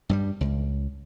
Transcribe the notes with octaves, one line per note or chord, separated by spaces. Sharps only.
G2 F#3 G3
C#2